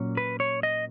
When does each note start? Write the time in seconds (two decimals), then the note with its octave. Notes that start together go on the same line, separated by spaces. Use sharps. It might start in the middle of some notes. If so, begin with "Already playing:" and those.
Already playing: A#2 F#3 A#3 C#4
0.17 B4
0.40 C#5
0.63 D#5